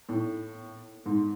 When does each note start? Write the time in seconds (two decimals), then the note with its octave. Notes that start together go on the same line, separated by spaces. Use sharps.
0.09 A2
1.06 G#2